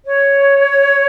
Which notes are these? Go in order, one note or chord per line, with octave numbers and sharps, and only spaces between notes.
C#5